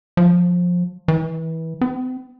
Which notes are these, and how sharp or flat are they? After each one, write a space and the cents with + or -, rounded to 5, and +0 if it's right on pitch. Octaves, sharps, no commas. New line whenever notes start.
F3 +20
E3 -25
C4 -40